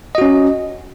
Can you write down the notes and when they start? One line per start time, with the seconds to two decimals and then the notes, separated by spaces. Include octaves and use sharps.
0.15 D#5
0.18 F#4
0.22 C#4